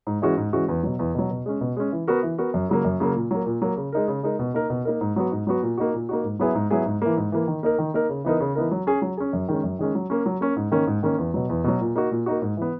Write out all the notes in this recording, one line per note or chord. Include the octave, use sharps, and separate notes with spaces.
G#2
E3 G#3 C#4 F#4
G#2
E3 G#3 C#4 F#4
E2
B2 F#3
E2
B2 F#3
B2
G#3 C#4
B2
G#3 C#4
E3
B3 F#4 A#4
E3
B3 F#4 A#4
F#2
C#3 F#3 A#3
F#2
C#3 F#3 A#3
A#2
F#3 A#3
A#2
F#3 A#3
C#3
G#3 D#4 A#4
C#3
G#3 D#4 A#4
B2
A#3 D#4 A#4
B2
A#3 D#4 A#4
G#2
F#3 B3 F#4
G#2
F#3 B3 F#4
A#2
A#3 D#4 F#4
A#2
A#3 D#4 F#4
G#2
F#3 B3 E4 G#4
G#2
F#3 B3 E4 G#4
G#2
E3 A#3
G#2
E3 A#3
D#3
A#3 D#4 A#4
D#3
A#3 D#4 A#4
C#3
E3 B3 D#4 A#4
C#3
E3 B3 D#4 A#4
F#3
C#4 G#4
F#3
C#4 G#4
F#2
D#3 G#3 C#4
F#2
D#3 G#3 C#4
F#3
A#3 C#4
F#3
A#3 C#4
G#2
D#3 A#3 C#4
G#2
D#3 A#3 C#4
E2
B2 F#3
E2
B2 F#3
A#2
A#3 D#4 F#4
A#2
A#3 D#4 F#4
G#2
E3 B3